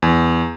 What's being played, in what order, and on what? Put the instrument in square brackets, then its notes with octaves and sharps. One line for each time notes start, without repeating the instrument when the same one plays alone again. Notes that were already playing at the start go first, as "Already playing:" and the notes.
[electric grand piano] E2